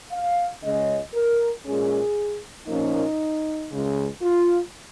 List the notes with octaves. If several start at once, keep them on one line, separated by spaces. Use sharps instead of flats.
F5
C#2 C#3 G#3 C#4 D#5
A#4
A#2 G#3 C#4 G#4
A#2 F3 A#3 C#4 D#4
C#2 C#3 G#3
F4